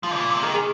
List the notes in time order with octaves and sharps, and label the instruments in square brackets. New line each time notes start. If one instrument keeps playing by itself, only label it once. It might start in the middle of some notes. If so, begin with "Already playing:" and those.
[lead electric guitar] F3 [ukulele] F4
[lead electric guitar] A#2
C3
[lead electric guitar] D#3 [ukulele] A#4
[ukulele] G#4